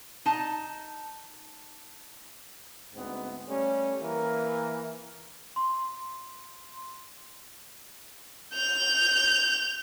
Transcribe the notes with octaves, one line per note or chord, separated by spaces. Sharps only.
D#4 A5
D2 G#2 B3 C4
G3 A3 C#4
E3 A#3 A#4
C6
G6 F7